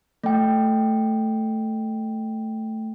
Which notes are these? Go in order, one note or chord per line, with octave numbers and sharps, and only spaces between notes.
A3 G5